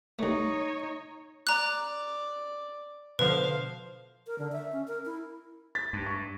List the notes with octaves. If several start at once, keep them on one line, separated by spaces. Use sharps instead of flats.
C2 A3 D#4 C#5
D5 A#5 F#6
B2 D3 F3 B4 C5 F5
A#4
D3
E5
C#4
A#4
E4
A6 B6
G2
C#6